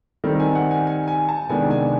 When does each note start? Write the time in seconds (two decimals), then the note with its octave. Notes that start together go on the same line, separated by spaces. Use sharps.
0.24 D#3 G3 C4
0.40 G#5
0.55 F#5
0.71 G#5
0.87 G#5
1.08 G#5
1.29 A5
1.49 C3 D#3 G#3 B3 D4 G#5
1.71 G#5